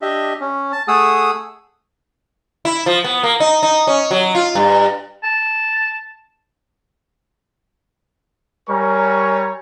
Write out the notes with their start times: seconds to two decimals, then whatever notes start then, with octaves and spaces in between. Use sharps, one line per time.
0.02 D4 G4 D#5 E5
0.40 C#4
0.73 A5
0.88 A3 G#4 F#5 D#6 E6
2.65 E4
2.86 F3
3.04 B3
3.23 A#3
3.40 D#4
3.63 D#4
3.87 C#4
4.11 F#3
4.35 F4
4.55 G2
5.23 A5
8.69 G3 A#4 C#5 G#5 A#5 C#6